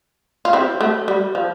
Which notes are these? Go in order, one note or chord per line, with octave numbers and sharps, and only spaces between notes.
F4
C4 E4
A3
G3
F3